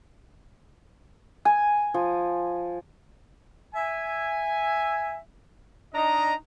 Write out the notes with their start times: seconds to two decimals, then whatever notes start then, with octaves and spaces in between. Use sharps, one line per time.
1.45 G#5
1.94 F3
3.75 E5 G#5
5.94 D4 D#4 D#5 A#5